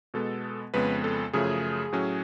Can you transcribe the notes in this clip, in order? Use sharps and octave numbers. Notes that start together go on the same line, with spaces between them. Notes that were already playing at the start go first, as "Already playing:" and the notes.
B2 G#3 B3 A4
F2 C#3 G#3 B3 B4
A4
F#2 C#3 F3 A3 G#4
A2 F#3 C#4